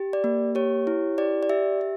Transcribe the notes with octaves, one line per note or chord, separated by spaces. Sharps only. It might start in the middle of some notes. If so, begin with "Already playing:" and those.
Already playing: G4
D5
A#3
G4 C#5
E4
G4 D5
D5
G4 E5
G4